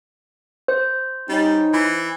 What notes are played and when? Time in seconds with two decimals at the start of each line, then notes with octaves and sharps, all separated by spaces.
0.68 C5
1.29 G3 C#4 D#4
1.73 E3